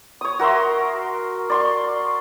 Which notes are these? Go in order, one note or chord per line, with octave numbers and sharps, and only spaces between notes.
C#5 D#6
F#4 A#4 E5 C6
D5 C6 C#6